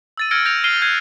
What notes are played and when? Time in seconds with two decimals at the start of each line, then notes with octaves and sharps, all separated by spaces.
0.17 E6 A6 D#7
0.31 E6 F6 G#6 A#6 C#7 D7
0.45 G6 A#6 D7 F7
0.64 F6 C7 D#7 G7
0.82 F#6 G#6 C7 D#7